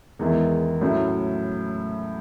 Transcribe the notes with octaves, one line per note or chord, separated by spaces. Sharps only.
E2 D#3 G#3 B3 E4
A2 F#3 C#4 E4